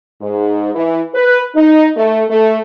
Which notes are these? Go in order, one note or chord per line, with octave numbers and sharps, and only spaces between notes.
G#2
E3
B4
D#4
A3
A3